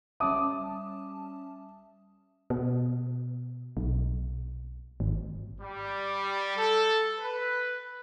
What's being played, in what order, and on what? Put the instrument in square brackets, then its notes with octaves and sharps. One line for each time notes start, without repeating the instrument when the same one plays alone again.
[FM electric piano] G3 C#4 A5 [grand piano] E5 D6 D#6
[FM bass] B2
B1
G#1
[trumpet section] G3
A4
B4